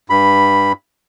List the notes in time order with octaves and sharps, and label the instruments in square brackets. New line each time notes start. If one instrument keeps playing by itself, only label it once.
[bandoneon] G2 B5